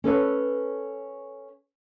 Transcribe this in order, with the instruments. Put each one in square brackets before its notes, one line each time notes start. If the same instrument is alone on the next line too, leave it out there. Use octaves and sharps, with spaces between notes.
[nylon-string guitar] C#4 A4 B4 C#5